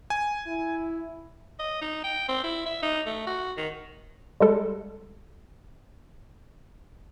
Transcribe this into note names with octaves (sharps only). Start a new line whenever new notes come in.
G#5
E4
D#5
D#4
G5
C4
E4
E5
D#4
A3
F#4
D#3
G3 G#3 A4